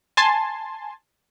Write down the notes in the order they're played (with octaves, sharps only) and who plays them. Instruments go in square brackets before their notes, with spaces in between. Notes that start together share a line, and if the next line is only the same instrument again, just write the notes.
[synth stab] G#5 A5 C6